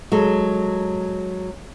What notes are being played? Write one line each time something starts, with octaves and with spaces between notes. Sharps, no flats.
F#3 G#3 A4